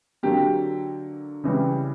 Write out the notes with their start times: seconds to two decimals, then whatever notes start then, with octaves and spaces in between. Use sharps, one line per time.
0.23 D3 F#3 A#3 G4
1.44 C#3 E3 G3